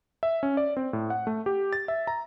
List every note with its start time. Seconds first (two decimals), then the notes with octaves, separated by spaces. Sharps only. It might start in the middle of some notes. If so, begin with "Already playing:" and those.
0.23 E5
0.43 C#4
0.57 D5
0.77 C4
0.93 A2
1.10 F#5
1.27 A3
1.46 G4
1.73 A6
1.88 E5
2.07 A#5